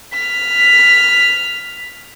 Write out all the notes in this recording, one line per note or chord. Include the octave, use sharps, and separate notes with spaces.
F6 B6